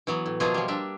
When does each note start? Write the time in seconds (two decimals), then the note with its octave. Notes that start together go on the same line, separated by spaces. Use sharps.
0.07 E3 F#3 B3
0.26 A2
0.40 B2 F3 F#3 A#3 F4 G#4
0.54 F3 G3
0.68 G3 D4 E5